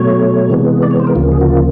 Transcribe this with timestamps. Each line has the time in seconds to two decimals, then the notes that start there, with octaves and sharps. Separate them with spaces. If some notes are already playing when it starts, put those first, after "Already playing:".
Already playing: B2 F#3 A3 C#5
0.50 C3 E3 G#3 B3
0.82 D5
0.91 C#5
1.00 C5
1.07 A#4
1.15 D2 C#3 F3 A#3 F4
1.32 G#4
1.41 F#4
1.49 F4